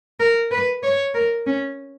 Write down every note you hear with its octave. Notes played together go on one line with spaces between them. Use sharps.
A#4
B4
C#5
A#4
C#4